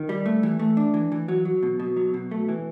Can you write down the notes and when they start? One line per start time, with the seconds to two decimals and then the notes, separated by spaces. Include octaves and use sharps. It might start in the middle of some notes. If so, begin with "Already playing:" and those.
Already playing: D#3
0.09 G3
0.26 A3
0.43 E3
0.60 A3
0.77 D4
0.94 E3
1.12 E3
1.28 F#3
1.45 F#3
1.63 B2
1.80 B2
1.97 F#3
2.14 B2
2.31 A3
2.49 E3